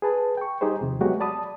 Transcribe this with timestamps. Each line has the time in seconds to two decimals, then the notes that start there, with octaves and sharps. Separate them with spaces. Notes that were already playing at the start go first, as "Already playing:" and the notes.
0.02 G#4 B4 A5
0.37 G5 C#6
0.61 G3 D#4 G4 G#4 C5
0.81 D#2 C3 F3
1.01 F#3 G#3 A3 B3 F#4 G4
1.20 D5 A5 B5 D#6